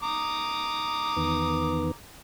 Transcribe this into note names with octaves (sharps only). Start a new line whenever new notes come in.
A#5 D6 D#6
E2 D#3 B3